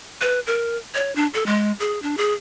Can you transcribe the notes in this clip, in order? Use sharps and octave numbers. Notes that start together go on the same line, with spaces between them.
B4
A#4
C#5
D4
A4
G#3
G#4
D4
G#4